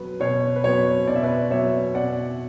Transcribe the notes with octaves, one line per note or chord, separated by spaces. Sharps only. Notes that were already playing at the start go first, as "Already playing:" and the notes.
Already playing: B2 F#3 B3 B4
B2 C#5
B4
F#3 B3 C#5
B2 D5
E5
B4 D5
F#3 B3 C#5 E5
B2 D5 F#5